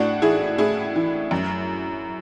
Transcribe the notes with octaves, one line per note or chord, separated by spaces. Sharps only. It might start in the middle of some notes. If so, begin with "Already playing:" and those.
Already playing: A2 D4 F#4
E3 E4 G#4
A2 E4 G#4
E3
F#2